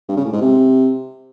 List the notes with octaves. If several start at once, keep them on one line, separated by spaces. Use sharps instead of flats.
G2
C#3
A2
G#2
C3